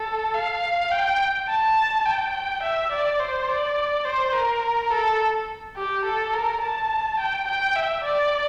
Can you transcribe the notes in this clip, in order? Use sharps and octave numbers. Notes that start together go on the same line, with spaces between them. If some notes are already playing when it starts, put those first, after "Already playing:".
Already playing: A4
F5
G5
A5
G5
E5
D5
C5
D5
C5
A#4
A4
G4
A4
A#4
A5
G5
G5
E5
D5